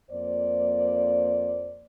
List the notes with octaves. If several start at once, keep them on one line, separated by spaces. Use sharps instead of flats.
F2 A#3 C5 D5